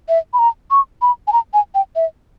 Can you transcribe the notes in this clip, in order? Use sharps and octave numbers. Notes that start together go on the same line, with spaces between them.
E5
B5
A#5
C#6
B5
G#5
A#5
G#5
G5
E5